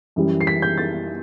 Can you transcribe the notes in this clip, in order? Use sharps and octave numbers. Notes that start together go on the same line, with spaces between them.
F#2 E3 G3
C7
B6
G6
A6